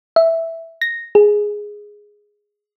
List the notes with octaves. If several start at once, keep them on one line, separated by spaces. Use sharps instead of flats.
E5
A#6
G#4